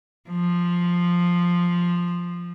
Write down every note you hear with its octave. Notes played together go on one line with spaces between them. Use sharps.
F3